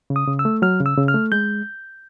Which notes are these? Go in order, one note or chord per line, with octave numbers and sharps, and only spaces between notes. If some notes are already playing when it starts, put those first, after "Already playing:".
C#3
D#6
C#3
E6
A3
F#3 F6
C#3
E6
C#3
F6
A3
G#3 G6